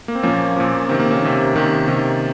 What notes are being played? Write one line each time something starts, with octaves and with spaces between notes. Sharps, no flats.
A#3
C4
A#2 F3 A#3 C#4
A#2 F3
C3 D#3 C4
A#3
A#3 C#4
C3 D#3
C3 D#3
C3 D#3